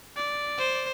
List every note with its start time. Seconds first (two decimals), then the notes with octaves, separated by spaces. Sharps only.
0.16 D5
0.58 C5